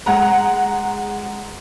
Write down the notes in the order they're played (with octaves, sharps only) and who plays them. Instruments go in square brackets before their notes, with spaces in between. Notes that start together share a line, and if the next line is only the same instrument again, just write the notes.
[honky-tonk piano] G#3 F#5 A#5